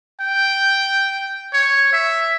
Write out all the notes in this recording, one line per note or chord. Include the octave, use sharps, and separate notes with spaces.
G5
C#5
E5